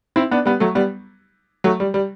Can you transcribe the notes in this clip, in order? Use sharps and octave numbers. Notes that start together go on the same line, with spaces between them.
C4 E4
B3 D4
G3 B3
F#3 A3
G3 B3
F#3 A3
G3
G3